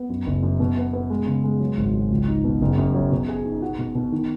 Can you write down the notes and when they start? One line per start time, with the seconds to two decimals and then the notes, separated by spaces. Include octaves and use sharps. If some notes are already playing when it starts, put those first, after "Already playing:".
Already playing: B3
0.09 F#2
0.26 F#1
0.43 F#2
0.60 B2
0.77 B3
0.93 B3
1.10 G#3
1.26 C#3
1.44 G#3
1.60 F#3
1.77 G#1
1.94 F#3
2.10 C#2
2.28 D#4
2.44 B2
2.61 F#1
2.78 F#2
2.95 F#3
3.12 B2
3.29 G#4
3.45 D#4
3.62 F#4
3.79 B2
3.95 B2
4.12 D#3